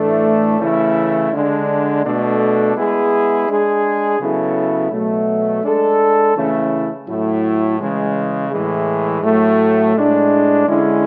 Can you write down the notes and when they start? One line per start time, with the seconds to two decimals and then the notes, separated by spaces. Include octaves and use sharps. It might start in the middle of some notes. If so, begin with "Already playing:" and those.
Already playing: A2 E3 A3 D4
0.59 C#3 E3 A3 C#4 E4
1.31 D3 G#3 D4
2.04 B2 A3 D4 A4
2.76 G#3 B3 E4 G#4
3.48 G#3 D4 G#4
4.20 C#3 F#3 B3 E4 A4
4.91 B2 F#3 A3
5.63 G#3 D4 A4
6.35 C#3 E3 A3 C#4 E4
7.07 A2 F#3 A3 E4
7.79 C#3 E3 G#3
8.50 A2 E3 G#3
9.22 A2 F#3 A3
9.95 A2 G#3 D4
10.66 D3 G#3 C#4 E4